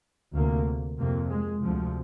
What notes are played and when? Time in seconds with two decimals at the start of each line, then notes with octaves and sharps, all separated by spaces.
0.34 D2 C3 A#3
0.98 F2 C3 A#3
1.30 G#3
1.63 D2 C3 F3